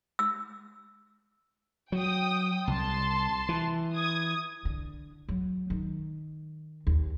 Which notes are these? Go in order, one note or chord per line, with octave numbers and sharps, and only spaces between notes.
E6
F#3 G5 D#6
C2 A5 C6
E3
D#6 G#6
D3
F#3
D#3
D#2